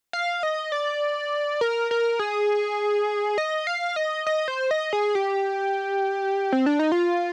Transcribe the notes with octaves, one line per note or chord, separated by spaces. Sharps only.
F5
D#5
D5
A#4
A#4
G#4
D#5
F5
D#5
D#5
C5
D#5
G#4
G4
C4
D4
D#4
F4